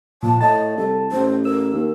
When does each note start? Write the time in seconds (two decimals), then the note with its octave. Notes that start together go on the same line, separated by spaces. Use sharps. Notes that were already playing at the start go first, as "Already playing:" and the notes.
0.23 A#2 F3 A5
0.41 A2 D#5 A5
0.77 C2 A4
1.12 A1 C5
1.45 A#4 E6
1.73 D#2